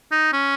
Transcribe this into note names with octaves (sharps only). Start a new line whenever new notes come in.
D#4
C#4